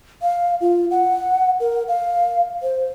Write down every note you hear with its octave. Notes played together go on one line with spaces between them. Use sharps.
F5
F4
F#5
A#4
F5
C5